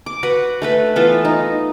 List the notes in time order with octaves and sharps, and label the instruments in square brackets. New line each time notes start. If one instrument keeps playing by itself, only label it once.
[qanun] D6
F#4 B4 F#5
A3 A4 B4 B5
E3 B3 F4 A4
D#4